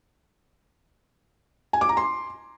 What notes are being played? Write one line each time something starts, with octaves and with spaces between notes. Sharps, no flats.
G#5
D6
A#5
C6